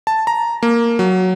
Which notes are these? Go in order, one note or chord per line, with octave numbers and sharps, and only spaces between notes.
A5
A#5
A#3
F#3